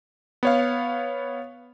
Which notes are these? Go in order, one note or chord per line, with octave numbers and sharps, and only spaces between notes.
B3 C#5 F5